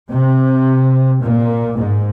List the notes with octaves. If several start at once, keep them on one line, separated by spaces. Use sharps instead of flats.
C3
A#2
G#2